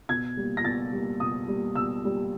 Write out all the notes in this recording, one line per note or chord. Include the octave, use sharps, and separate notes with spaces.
B2 G#6
G3 A#3
A#6
B2 A6
G3 A#3
B2 D#6
G3 A#3
B2 E6
G3 A#3